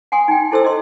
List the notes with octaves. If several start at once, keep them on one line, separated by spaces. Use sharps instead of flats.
F#5 G#5 C6 D#6
D#4 G5
E4 A4 C5 C6 E6
D#5 C6